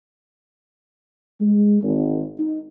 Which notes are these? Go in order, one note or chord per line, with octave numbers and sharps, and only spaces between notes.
G#3
G#1
D#4